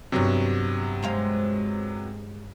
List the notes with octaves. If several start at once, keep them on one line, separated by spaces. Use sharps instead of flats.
G2 C3 F#3 B3 C#5
G#3 C5 F5